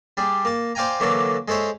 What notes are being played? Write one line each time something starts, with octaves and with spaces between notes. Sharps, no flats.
G3 D4 G#4
A#3 A5
C5 D5 F5 G5 G#5 A#5
D3 E3 F#3 A#3 D4 A4
G#3 A4 C5 C#5 E5